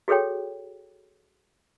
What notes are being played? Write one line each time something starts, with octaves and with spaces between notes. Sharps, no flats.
F#4 G#4 A4 C#5 G5